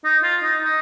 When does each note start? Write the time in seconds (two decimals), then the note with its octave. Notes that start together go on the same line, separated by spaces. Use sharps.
0.04 D#4
0.23 F4
0.43 D#4
0.62 D#4